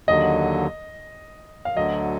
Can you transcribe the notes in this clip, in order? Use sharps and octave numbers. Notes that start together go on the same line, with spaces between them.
D#2 D3 F#3 D#5
F5
D2 D3 F#3 D#5